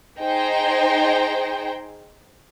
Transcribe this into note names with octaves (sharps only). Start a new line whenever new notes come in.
D#4 G#4 C5 G5